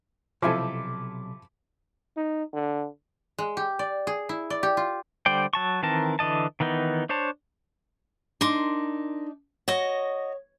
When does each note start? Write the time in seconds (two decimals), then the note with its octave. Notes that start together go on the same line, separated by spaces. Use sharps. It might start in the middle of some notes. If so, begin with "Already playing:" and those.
0.42 B1 C3 F3 E4 A4 G#5 B5 D6
2.17 D#4
2.53 D3
3.38 G#3
3.57 G4
3.79 D5
4.07 G#4
4.29 E4
4.50 D5
4.63 G4
4.77 F4
5.26 D3 G3 C5 D5 G5
5.53 F#3 A5 C#6
5.83 D#3 E3 C4 A#4 A5
6.19 D3 E3 D#5 A5
6.60 D#3 E3 B3 D#4
7.09 D4 C5 C#5 A5
8.41 D4 D#4 A#4 C6 D6
9.68 F#4 C#5 D#5